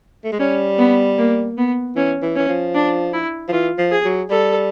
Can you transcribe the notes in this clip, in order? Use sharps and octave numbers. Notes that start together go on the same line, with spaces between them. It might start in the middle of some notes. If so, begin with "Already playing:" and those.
A3
G#3
G3 C#4
B3
A#3
B3
E3 C#4
E3
E3 C#4
F3
D4
E4
F3
E3 F4
F3
G#4
F#3
G3 A4